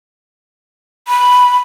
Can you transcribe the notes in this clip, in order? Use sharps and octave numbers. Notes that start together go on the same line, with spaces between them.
B5